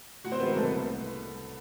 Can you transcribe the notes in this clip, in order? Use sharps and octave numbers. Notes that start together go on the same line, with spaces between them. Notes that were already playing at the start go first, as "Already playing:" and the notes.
A2 F#4 F#5
C4 C5
E3 G#3 B3 B4
A#3 A#4
C2 A3 A4
B3 B4